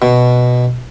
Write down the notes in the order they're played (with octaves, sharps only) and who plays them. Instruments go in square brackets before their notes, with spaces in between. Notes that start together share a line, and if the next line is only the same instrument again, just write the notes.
[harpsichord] B2